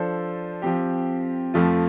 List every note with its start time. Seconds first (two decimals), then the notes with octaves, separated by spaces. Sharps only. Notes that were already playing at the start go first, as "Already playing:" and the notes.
Already playing: F3 D4 A4 C5
0.62 F3 C4 G4
1.54 F2 F3 A3 F4